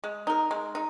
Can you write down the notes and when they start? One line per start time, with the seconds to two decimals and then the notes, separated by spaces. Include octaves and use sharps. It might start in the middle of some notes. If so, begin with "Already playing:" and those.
0.04 G#3
0.27 D#4 A#4
0.51 G#3
0.75 D#4